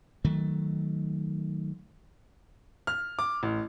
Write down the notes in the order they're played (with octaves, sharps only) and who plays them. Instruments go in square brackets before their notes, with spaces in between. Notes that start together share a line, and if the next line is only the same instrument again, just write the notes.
[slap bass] D#3 F#3 A3
[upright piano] F6
D6
A1